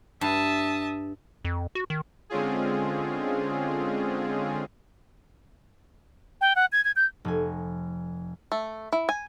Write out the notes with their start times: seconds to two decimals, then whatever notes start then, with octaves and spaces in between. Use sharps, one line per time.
0.21 G2 E5 A5 D#6
1.45 F2
1.75 F#4
1.90 D#3
2.30 D3 G#3 C4 C#4 F4 G#4
6.41 G5
6.56 F#5
6.72 G#6
6.85 G#6
6.96 G6
7.25 F1 G#5
8.52 A3
8.93 E4
9.09 G#5